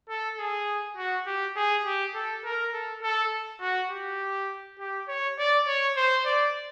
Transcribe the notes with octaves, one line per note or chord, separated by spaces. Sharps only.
A4
G#4
F#4
G4
G#4
G4
A4
A#4
A4
A4
F#4
G4
G4
C#5
D5
C#5
C5
D5